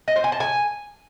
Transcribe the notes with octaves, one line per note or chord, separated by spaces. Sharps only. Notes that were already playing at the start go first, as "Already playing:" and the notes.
D#5
C5
G#5
A5
G#5